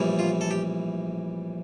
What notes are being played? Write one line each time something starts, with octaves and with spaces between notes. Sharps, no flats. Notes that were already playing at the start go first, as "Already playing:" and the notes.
Already playing: A#1 A2 E3 G3
F4
A4
G4